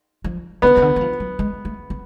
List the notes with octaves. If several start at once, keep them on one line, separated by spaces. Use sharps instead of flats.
F3
D3 B3
C#3
D3
F#3
F3
F#3
G#3
A3
B3